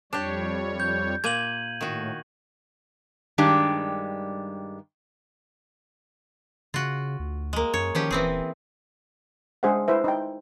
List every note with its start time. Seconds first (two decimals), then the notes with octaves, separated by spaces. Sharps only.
0.13 F2 G3 D4 G4 C#5
0.80 G6
1.24 A#2 A#3 G#6 D#7 F#7
1.81 A2 D#3 F#4
3.38 G2 D#3 G3 G#3 D4 G4
6.74 C#3 F4 F#4
7.19 D2
7.53 G#3 A#3
7.74 F#2 C#5
7.95 D#3 F3 C#4 G4
8.11 D#1 E3 C4 G#4
9.63 G#3 D4 G#4 C5 E5 F#5
9.88 E4 B4 C5 E5
10.04 D#4 G5